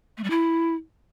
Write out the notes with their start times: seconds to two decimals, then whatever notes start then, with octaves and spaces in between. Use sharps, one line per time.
0.17 A3
0.24 G3
0.30 E4